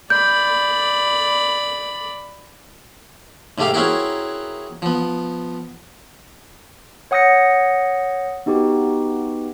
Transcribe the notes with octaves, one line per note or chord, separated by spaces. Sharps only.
D5 B5 G6
G#2 C3 A3 G4 F5 C6
C4 C#4 E4 F#4 G#4 A#4
F3 B3
C#5 F#5 D#6 G6 A#6 C#7
B3 D#4 F#4 G4 B4